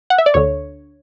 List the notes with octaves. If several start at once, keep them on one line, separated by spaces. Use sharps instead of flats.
F#5
E5
D5
D2 D3 C#5